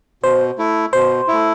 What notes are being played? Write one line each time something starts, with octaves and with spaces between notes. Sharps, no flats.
B2 C5
A3 E4
B2 C5
A3 E4